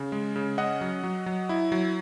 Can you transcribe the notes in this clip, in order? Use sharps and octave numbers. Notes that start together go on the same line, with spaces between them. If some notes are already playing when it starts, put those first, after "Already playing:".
Already playing: C#3
G#3
C#3
C#4 D#5 F#5
F#3
F#3
F#3
E4
F#3